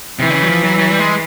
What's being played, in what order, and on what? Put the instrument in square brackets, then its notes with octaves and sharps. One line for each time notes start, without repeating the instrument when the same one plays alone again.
[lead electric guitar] C3 [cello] E3
[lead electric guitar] D3
C#3
F#3
F3
F#3
F#3
G3
G#3